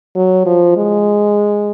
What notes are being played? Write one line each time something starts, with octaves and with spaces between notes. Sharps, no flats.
F#3
F3
G#3